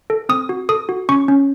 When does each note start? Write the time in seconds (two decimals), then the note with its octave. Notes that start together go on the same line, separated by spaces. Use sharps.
0.10 A4
0.29 C4 D#6
0.49 F#4
0.69 A4 D#6
0.89 F#4
1.09 C#4 C#6
1.28 C#4